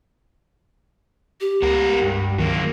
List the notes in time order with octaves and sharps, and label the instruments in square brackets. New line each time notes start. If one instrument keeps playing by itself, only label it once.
[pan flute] G4
[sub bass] C#2 [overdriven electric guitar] B3 A#4
[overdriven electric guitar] G2
[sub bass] D#3 [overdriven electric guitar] F#3 A#3